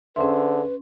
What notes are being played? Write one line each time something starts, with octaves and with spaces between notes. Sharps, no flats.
D3 C#4 G#4 B4 C5 E5 C6